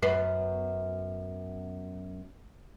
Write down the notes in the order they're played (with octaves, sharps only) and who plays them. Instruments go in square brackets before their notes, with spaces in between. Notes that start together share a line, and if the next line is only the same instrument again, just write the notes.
[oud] F#2 B3